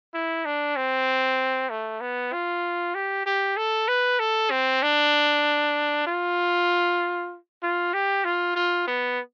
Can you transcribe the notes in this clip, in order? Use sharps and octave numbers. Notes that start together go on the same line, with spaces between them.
E4
D4
C4
A3
B3
F4
G4
G4
A4
B4
A4
C4
D4
F4
F4
G4
F4
F4
B3